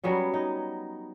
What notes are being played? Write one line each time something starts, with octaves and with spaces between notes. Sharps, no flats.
F#3 G3 B3 C#4
D#4